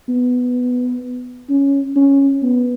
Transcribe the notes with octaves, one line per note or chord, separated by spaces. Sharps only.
B3
C#4
C#4
B3